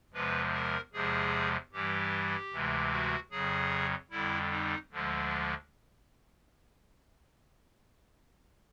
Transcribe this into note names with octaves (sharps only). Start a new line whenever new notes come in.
E2 C3 F3 G#3 B4
A#4
E2 C3 F3 G#3 G#4
G2 E3 G3 G4
D2 C3 E3 G#3
F#4
F2 C#3 F#3 G#4
F2 D3 G3 E4
D#4
D2 D3 F3 G#3